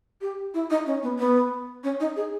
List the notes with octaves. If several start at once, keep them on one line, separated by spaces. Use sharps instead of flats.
G4
E4
D#4
C#4
B3
B3
C#4
D#4
G#4